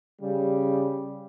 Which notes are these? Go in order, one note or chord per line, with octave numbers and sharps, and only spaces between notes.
C#3 G3